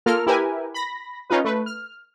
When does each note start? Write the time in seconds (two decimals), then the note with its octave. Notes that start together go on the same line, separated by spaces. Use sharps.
0.06 A#3 F4 A4 A#4 F6
0.26 E4 G4 A#4 B4 G#5
0.74 B5 A#6
1.30 C#4 D#4 F4 B4
1.44 A3 B4
1.66 F6